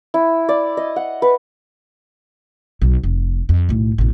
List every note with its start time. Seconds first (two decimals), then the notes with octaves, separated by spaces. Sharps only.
0.14 E4
0.49 D5
0.77 D#5
0.96 F#5
1.22 B4
2.82 B1
3.03 F1
3.49 F2
3.69 B1 A2
3.98 E1 A1